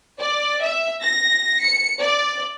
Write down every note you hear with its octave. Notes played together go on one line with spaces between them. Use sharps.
D5
E5
A#6
C#7
D5